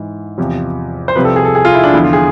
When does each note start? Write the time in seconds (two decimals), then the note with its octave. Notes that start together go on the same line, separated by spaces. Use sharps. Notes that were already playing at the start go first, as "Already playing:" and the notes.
Already playing: G#2 E3
0.38 E2 C3 F3
1.08 C5
1.15 C2 C3 F3 B4
1.25 A4
1.36 G#4
1.45 A4
1.55 G#4
1.65 F4
1.74 E4
1.84 D4
1.93 E2 D3 F3 E4
2.04 F4
2.13 G#4